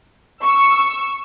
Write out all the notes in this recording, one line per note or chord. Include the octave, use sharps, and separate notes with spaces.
C#6 E6